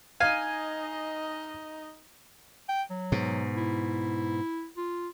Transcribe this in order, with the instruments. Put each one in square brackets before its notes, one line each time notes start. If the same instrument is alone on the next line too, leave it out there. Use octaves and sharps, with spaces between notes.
[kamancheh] D#4 D#5 [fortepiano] F5 [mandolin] G#5
[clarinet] G5
F#3
[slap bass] G#2 B2
[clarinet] E4
F4